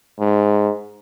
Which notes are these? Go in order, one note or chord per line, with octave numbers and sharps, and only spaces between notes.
G#2